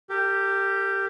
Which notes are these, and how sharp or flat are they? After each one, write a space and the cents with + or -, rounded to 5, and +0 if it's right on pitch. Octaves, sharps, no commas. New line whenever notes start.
G4 +0 A#4 -45